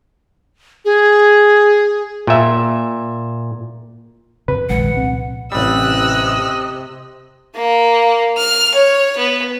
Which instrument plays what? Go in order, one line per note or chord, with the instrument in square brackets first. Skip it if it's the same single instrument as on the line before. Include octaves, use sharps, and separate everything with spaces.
[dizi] G#4
[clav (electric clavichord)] A#2 E5
[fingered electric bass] F2 C3 [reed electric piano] B4
[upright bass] A#1 [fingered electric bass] D#3 G#3 [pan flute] F#5
[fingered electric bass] C2 C3 C4
[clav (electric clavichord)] A1 G3 [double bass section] C3 [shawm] D#5 [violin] E6 F#6
[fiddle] A#3
F6
C#5
B3